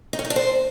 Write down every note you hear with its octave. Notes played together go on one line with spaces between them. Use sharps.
D#4
C#4
D#4
D4
C5